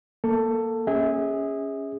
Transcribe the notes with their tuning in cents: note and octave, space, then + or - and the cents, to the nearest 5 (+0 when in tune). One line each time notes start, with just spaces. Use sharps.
A#3 +5 A4 +15
C#4 +0 G#4 -20 E5 -35